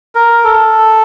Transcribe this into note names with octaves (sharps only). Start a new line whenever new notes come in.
A#4
A4